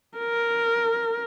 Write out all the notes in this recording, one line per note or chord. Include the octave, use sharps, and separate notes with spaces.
A#4